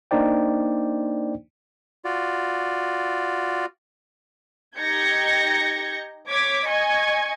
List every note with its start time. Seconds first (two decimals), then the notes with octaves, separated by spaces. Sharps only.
0.11 A#3 D4 D#4 C5 D5 G5
2.05 F4 F#4 D5
4.79 D#4 G4 G6 G#6 A#6 C#7
6.30 C#5 D6 G#6 B6
6.68 D#5 G#5 C#6 G#6